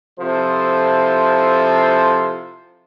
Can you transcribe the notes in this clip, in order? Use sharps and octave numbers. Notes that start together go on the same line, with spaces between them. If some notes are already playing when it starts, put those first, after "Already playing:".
C3 F3 E4 A4 C5